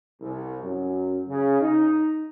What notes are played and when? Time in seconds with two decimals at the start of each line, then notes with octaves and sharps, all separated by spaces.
0.21 C2
0.62 F#2
1.28 C#3
1.60 D#4